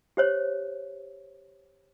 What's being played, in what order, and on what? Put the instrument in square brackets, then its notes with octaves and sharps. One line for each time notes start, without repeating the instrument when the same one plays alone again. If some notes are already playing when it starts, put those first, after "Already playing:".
[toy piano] G4 C5 C#5